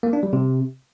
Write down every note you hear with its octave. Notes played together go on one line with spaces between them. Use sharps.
A#3
D4
G3
C3